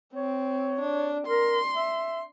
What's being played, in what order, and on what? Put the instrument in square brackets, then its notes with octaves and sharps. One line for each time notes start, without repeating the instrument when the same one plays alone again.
[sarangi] C4 [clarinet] C#5
[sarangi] D4
[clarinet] A#4 [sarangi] C6
[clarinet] E5